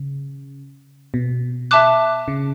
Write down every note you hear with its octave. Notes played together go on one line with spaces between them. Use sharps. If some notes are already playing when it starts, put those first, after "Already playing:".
Already playing: C#3
B2
E5 A5 D6 F#6
C#3